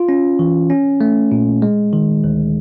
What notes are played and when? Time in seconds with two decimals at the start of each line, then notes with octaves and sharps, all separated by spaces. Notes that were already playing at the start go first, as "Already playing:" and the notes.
Already playing: F4
0.09 C#4
0.39 E3
0.70 C#4
1.01 A3
1.32 A#2
1.62 G#3
1.93 D#3
2.24 D2